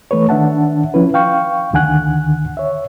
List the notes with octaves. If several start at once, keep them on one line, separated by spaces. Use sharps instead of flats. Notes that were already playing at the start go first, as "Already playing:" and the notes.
E3 A3 B4 C#5
D#3 D4 E5 F#5 A5
F3 C#4 E4 B4
F5 G5 C#6
D2 D3 D#3 F#5 G#5 F#6
C#5 E5